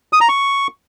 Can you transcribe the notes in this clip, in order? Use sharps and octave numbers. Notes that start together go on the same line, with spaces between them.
D#6
A#5
C#6